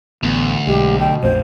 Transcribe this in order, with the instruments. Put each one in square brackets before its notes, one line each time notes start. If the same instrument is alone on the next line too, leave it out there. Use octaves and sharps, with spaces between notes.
[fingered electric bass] A1 [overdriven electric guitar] D2 [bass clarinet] B3
[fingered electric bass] B1 [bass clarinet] G#3 [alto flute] G4
[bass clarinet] B2 [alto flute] G5
[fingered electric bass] A#1 F2 A3 [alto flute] C5